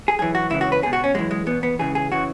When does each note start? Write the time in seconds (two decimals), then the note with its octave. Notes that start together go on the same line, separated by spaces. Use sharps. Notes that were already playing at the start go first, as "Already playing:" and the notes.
0.08 G#4
0.19 F#2 E3 G#4
0.35 F#4
0.50 C#2 C#3 E3 E4
0.61 F#4
0.72 B4
0.83 C#2 G#4
0.86 B2
0.93 F#4
1.04 C#4
1.14 F#2 E3 G#3
1.31 G#3
1.46 E2 B2 B3
1.63 B3
1.79 C#2 C#3 E3 G#4
1.95 G#4
2.12 C#3 E3 F#4